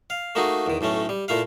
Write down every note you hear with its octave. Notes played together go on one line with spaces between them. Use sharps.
F5
A3 A#3 D#4 F#4 G#4
E2 D#3
B1 A2 A3 C#4
G3
A#2 A3 E4 F5